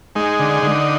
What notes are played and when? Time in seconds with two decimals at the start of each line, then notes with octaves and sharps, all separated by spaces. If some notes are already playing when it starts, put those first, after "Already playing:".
0.15 G#3 D#4
0.40 D3
0.63 D3